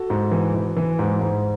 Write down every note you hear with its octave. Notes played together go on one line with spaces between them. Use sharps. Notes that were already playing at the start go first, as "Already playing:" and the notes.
Already playing: F#4 A4
G#2
E3
E3
E3
G#2
G#2